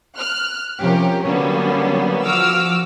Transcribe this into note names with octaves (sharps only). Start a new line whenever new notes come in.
F6 F#6
C3 F3 C#4 G4 A#4
D3 F#3 G3 A#3 B3 C#4
F3 F#4 D6 E6 F6